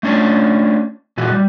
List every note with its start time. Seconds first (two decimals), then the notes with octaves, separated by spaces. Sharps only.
0.03 A3 C#4 D4 C#5
1.17 A#2 E3 F#4
1.31 G3